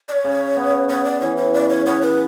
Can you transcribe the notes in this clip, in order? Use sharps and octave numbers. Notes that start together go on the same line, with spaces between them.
D5
C#5
C#3
B3
B3 C#5
D5
E3 C#5
C#5
C#3 D5
C#5
B3 C#5
B4